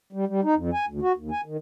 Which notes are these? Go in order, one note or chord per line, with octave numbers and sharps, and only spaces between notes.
G3
G3
D#4
F2
G#5
D2
F#4
D#2
G#5
D#3